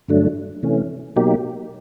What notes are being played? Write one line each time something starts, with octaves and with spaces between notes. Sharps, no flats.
G2 D3 F#3 A3 D4
C3 E3 A3 C#4
B2 F#3 A#3 D#4 G4